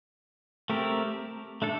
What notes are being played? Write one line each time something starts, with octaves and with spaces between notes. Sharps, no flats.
A3 C4 G4 A#4
A3 D4 A4